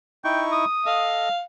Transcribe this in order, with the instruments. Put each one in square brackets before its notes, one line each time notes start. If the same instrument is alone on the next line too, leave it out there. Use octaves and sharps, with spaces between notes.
[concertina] D#4 E4 C#6 [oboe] G5
[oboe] D#6
[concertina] A4 D#5 [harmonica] F5